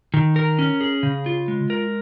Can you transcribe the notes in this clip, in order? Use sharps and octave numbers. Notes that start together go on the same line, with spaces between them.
D#3
A#4
C#4
G#4
C#3
F4
G#3
A#4